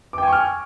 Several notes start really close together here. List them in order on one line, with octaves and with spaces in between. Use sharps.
D6 G5 G#5 C#6 F6